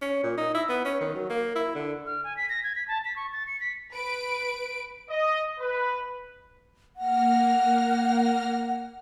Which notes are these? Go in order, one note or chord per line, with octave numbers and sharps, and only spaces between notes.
C#4
A#2
D#4
E4
B3
C#4
D#3
F#3
A#3
E4
D3
F6
G#5
B6
A#6
G#6
B6
A5
B6
C#6
A6
C#7
B6
B4 D7
D#5
B4
A#3 F#5 F6 A#6